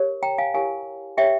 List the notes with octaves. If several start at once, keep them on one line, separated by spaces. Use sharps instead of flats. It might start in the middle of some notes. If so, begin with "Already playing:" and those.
Already playing: G4 A#4 C#5
G5 A#5
F5 G#5
E4 G4 A#4 C#5 F5 G#5
G4 A#4 C#5 E5 G5